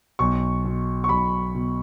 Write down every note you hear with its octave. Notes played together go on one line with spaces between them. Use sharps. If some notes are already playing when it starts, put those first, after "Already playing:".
B1 C#6
B2
C#6
B1 B5
B2